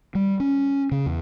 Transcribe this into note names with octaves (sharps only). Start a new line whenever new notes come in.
G3
C#4
C#3
E2